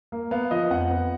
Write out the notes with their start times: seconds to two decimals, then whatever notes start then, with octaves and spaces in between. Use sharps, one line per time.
0.12 A#3
0.31 B3 F5
0.51 F3 D#5
0.70 F2 F#5
0.91 B3